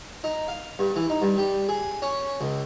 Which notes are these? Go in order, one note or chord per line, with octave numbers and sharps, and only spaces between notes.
D#4
F5
G2
E3
D#4
G2
G3
G#4
C#4
C#2